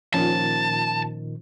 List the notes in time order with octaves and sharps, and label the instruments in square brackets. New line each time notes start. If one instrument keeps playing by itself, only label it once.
[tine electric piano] A#2 D#3 [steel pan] F3 C#4 F4 [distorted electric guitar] A5